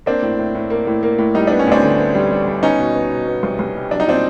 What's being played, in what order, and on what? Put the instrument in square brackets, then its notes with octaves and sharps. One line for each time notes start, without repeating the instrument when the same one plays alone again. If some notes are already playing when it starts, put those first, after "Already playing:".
[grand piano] A#3 [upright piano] C4 D4
[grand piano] A2
A2
A2
A#3
A2
A#3
A2
[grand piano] G3 [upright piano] D#4
[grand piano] B3 [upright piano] D4
[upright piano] C#4
[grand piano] D2 [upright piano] C4 D4
[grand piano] D3
B3
G3
G3
G3
[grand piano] B3 [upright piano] C#4 D#4
[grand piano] B2
B3
B2
B3
C2
C2
G3
[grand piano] F#3 [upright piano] D4
[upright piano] D#4
[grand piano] A#2 [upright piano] C4 D4